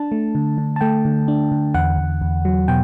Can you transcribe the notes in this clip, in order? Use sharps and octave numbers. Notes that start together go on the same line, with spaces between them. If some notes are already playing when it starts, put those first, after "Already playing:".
Already playing: D4 A5
A3
D3
D3
A5
A3 G5
D3
D4
D3
E2 F#5
E2
E2
F#3
B2 G5